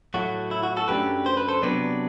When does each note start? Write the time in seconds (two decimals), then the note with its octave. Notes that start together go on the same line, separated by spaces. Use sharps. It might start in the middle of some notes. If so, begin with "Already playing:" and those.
0.14 A2 F#3 A3 F#4
0.51 E4
0.63 F#4
0.76 F#4 A4
0.88 F#2 F#3 A3 D4 G4 B4
1.26 C5
1.37 B4
1.48 A4 C5
1.62 C3 F#3 B3 D4 B4 D5